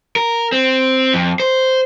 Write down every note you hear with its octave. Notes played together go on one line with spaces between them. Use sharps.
A#4
C4
F2
C5